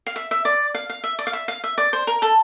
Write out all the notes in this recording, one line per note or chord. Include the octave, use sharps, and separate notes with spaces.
F5
E5
E5
D5
F5
F5
E5
D5
F5
E5
F5
E5
D5
C5
A#4
A4